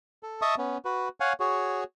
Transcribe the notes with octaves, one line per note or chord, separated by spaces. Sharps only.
A4
D#5 E5 A5 C#6 D#6
B3 C#4
F#4 B4
C#5 F5 F#5 G#5
F#4 G#4 C#5